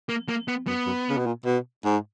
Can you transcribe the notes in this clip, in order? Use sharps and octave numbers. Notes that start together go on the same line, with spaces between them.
A#3
A#3
B3
F#2 B3
F#2
C#3
B2
A#2
B2
G#2